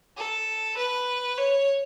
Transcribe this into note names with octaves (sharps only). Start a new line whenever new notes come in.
A4
B4
C#5